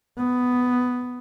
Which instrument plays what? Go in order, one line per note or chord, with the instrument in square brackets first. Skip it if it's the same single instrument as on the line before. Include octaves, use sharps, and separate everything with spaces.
[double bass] B3